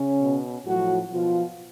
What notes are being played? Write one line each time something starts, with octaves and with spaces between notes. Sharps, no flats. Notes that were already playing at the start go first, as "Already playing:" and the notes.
Already playing: C#3 C#4
B2
A2 F3 F#3 F#4
B2 F3 F4